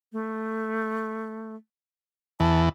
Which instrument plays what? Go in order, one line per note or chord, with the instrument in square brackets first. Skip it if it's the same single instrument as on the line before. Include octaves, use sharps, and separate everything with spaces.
[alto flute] A3
[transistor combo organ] E2 E3 [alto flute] A5